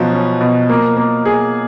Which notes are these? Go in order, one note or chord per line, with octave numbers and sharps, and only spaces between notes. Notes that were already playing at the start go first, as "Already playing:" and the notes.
Already playing: B2 F3 F#3 C#4
C#4
B2
A#3
A#3
G#4